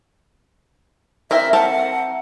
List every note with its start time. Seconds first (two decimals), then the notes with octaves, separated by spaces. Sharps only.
1.31 C4 E4 A#4 E5
1.53 C4 A#4 F#5 A5